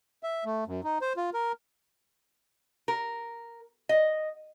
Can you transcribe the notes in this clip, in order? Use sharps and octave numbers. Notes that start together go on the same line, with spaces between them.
E5
A3
F#2
D#4
C5
F4
A#4
A#4
D#5